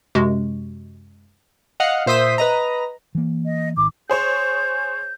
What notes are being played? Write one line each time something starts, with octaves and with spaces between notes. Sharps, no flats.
F#2 C3 G#3 F#4
D#5 F5 F#5
A#2 C5 E5 D#6 B6
B4 D#5 A#5
E3 A#3
D#5
G#1 D#3 D6
G#4 C5 C#5 G6